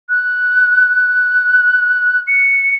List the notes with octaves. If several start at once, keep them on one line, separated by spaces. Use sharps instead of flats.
F#6
C#7